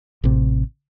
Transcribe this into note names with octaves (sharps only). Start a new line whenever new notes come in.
A1 C3